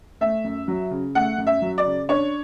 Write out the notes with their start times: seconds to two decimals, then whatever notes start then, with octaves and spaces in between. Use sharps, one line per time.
0.21 A3 E5
0.45 F#2
0.68 F#3
0.91 C#3
1.15 A3 F#5
1.38 F#2
1.47 E5
1.62 F#3
1.78 D5
1.86 C#3
2.09 D4 C#5